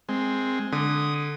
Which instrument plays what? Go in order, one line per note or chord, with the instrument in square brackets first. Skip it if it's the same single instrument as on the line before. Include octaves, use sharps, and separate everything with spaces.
[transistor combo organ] G#3 C4
[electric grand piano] D3 [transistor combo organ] D#6